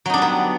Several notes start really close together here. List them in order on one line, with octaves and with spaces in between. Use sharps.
F#3 D#4 D4 G3 B3